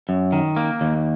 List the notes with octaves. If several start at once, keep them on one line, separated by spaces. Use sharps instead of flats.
F#2
D#3
A#3
D#2